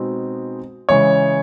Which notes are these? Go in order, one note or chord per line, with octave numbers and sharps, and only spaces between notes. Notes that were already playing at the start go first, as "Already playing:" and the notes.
Already playing: B2 G#3 C4 D#4
C#3 E3 G#3 C#5